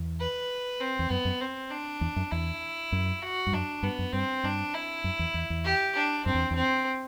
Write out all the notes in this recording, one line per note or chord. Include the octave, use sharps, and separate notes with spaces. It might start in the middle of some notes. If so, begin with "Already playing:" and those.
Already playing: E2
B4
C4
E2
F#2 B3
F#2
C4
D4
E2
F#2
E2 E4
F#2
F#4
G2
F#2 D4
G2 B3
F#2
G2 C4
G2 D4
E4
F#2
E2
E2
E2
G4
D4
F#2 C4
E2
E2 C4